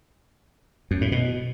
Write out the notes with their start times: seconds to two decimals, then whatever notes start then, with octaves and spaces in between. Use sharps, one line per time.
0.91 F#2
1.01 A2
1.12 B2